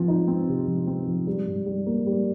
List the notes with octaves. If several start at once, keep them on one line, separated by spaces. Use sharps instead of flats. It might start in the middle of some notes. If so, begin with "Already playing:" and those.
Already playing: F3 C4
D#4
C4
C3
F3
C4
F3
G3
G2
G3
A#3
G3